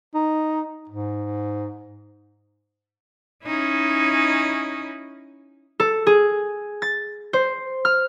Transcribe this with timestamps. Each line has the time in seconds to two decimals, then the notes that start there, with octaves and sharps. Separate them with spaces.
0.15 D#4
0.89 G#2
3.46 C#4 D#4 E4
5.80 A4
6.07 G#4
6.82 A6
7.33 C5
7.85 F6